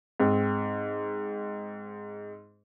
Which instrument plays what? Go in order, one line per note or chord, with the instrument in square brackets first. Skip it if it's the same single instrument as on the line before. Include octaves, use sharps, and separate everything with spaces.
[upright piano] G#2 C4